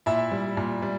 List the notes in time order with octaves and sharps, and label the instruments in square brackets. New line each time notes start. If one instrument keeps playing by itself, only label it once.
[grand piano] A#2 E4 E5
G3
A#2
G3